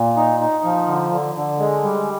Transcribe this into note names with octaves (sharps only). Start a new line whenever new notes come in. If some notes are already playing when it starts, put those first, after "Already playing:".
Already playing: A#2
D#4
D#4
F3
D3
D3
D3
G#3
G3